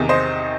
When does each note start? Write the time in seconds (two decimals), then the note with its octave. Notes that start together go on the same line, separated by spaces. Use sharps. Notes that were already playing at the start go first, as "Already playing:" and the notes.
Already playing: E2 C3 D#3
0.09 C5 D#5